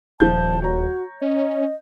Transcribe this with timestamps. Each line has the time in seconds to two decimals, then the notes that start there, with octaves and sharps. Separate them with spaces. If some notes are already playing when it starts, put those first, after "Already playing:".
0.20 D#1 F3 A5 G6
0.62 F#4 C#5 A#5
1.21 C#4 D#5